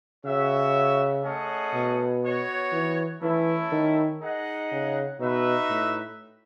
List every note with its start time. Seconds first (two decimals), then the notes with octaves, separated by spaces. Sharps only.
0.25 C#3 F#4 C#5 E5
1.24 A3 C#4 G#4 D#5 F#5
1.74 B2
2.23 B3 F#4 C#5
2.73 E3
3.22 E3 A3 C#4 E4
3.72 D#3
4.21 D#4 G#4 D#5 F#5
4.72 C#3
5.20 B2 D#4 F#4 B4 E5
5.70 A2